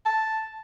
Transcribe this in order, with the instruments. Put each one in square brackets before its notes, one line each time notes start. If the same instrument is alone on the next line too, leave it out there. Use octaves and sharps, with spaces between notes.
[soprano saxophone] A5